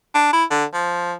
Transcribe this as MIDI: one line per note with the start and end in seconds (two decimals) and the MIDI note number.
0.15 0.32 62
0.33 0.44 64
0.51 0.65 50
0.74 1.14 53